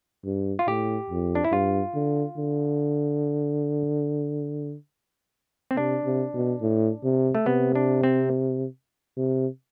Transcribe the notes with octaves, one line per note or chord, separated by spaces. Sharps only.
G2
F4
A2 G4
F2
D4
E4
G2 F4
D3
D3
C4
C3 D4
C3
B2
A2
C3
A3
C3 B3
D4
C4
C3